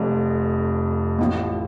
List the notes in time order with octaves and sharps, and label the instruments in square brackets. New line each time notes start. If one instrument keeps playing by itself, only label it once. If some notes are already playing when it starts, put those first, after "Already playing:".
Already playing: [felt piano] F1 F2 F3
A1 A2 F3